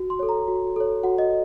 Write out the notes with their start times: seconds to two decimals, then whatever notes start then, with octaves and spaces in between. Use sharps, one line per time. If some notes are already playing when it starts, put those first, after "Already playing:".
Already playing: F#4
0.10 C6
0.19 A4 C#5
0.29 A#5
0.48 F#4
0.76 A4 C#5
1.03 F#4 F#5
1.18 D#5